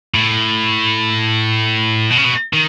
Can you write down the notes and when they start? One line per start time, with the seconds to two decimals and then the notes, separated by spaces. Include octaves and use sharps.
0.15 A2
2.10 B2
2.17 C#3
2.24 B2
2.53 D#3